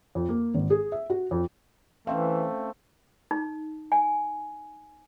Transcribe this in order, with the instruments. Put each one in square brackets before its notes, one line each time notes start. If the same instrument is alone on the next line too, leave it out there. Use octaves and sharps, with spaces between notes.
[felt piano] F2
A#3
G#1
G#4
E5
F#4
F2
[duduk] E3 [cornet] A3 [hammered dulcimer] C4 [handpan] C#4 E5 F5
[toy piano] D#4
G#5